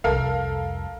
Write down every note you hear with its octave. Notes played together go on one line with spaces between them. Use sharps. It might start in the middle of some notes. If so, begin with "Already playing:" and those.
C2 F2 A4 A#4 F5